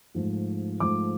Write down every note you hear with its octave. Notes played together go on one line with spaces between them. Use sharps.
G#2 F3 A3
G#2 F3 A3 D6